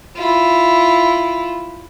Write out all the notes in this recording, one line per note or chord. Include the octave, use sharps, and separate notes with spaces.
E4 F4